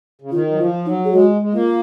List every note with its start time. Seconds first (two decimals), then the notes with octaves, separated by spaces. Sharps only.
0.21 C#3
0.31 D#3 F4
0.51 F#3
0.58 F3 F4
0.85 F#3 D#4
1.04 G#4
1.12 G#3 F#4
1.41 G#3
1.53 A#3 F4